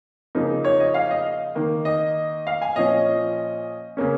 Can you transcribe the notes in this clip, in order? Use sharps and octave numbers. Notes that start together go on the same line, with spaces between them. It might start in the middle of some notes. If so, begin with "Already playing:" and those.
C#3 F3 A#3 D#4
C#5
D#5
F5
D#5
D#3 A#3 D#4
D#5
F5
G#5
A#2 F3 C#4 D#5
C#3 A#3 C#4